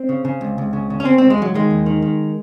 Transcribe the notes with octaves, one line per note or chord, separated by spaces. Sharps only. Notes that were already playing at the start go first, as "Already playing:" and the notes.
Already playing: C4
C#3
C#3
C#2
C#2
C#3
C#3
C#4
C#3 C4
C#2 C4
G#3
C#2 F#3
D#3 G#3
D#2
D#3
D#3